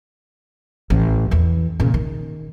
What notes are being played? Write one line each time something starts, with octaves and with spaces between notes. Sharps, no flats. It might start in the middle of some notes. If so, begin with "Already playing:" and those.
A1
E2 E3
A#2 C#3
D#3